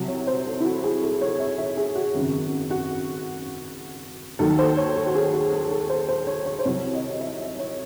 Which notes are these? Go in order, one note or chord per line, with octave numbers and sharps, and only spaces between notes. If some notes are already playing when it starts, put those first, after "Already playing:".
Already playing: C2 C3 F#3
C#5
C5
A4
E4
F#4
G#4
A4
C#5
E5
E5
G#4
F#4
G#1 F#2 C#3
F#4
D#2 D#3 F#3 A4
C5
C#5
A4
F#4
G#4
F#4
A4
A4
C5
C5
C#5
C#5
C5
C2 C3 F#3 C#5
D#5
E5
C#5